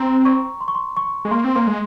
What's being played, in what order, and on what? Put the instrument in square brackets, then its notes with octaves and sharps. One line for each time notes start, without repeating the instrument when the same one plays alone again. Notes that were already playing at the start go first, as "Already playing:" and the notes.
Already playing: [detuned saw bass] C4 [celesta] A#5
[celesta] C#6
C6
C#6
C6
C#6
[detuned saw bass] G#3
[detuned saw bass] A#3 [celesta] C6
[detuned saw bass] C4
[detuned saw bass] A#3 [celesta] C6
[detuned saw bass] G#3